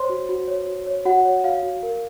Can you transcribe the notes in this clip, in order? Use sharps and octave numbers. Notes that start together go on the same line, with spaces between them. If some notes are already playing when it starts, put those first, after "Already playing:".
Already playing: C5 C#5 C6
F#4
F#4
C#5
F#4
C#5
F#4 F#5
C#5
F#4 F5
F#4
A#4